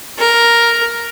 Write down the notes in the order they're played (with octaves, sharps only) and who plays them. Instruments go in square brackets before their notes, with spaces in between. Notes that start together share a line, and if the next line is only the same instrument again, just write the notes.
[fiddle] A#4